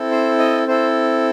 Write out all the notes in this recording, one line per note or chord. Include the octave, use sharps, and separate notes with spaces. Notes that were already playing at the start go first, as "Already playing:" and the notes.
Already playing: C4 E4 A4
C5
D#5
C4 E4 A4 C5